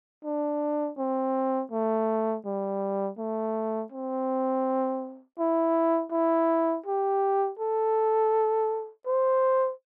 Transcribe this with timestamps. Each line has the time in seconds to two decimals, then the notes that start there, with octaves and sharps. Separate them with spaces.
0.25 D4
0.98 C4
1.71 A3
2.45 G3
3.19 A3
3.92 C4
5.39 E4
6.12 E4
6.86 G4
7.59 A4
9.06 C5